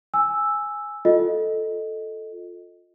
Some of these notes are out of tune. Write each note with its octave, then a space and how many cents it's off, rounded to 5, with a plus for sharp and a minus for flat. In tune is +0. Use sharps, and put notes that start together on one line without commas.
G#5 +0 E6 +0
F4 +20 A4 +0 D#5 +0